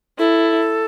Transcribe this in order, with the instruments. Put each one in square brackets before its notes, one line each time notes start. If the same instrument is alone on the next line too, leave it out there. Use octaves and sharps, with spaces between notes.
[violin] E4 [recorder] A4